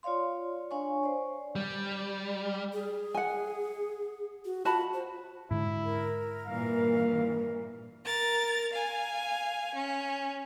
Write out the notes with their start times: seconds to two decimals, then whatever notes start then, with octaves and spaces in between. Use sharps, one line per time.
0.03 F4 C#5 D5 F5 C6
0.71 D4 C#5 F5 G#5 C#6
1.03 C5 D5
1.55 G3
2.73 G#4
3.14 F#5 G#5
4.45 F#4
4.65 F4 F#4 A5 B5
4.94 C5
5.51 G#2 D3 E4
5.85 A#4
6.46 G2 A#2 E3 F5
8.05 A#4 A6
8.73 F5 G#5
9.74 C#4